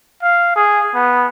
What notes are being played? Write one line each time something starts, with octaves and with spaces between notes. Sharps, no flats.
F5
G#4
B3